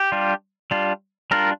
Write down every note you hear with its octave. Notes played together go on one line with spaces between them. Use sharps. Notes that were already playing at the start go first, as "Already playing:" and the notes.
Already playing: G4
G3 D4 F4
G3 D4 F4
G3 D4 F4 A#4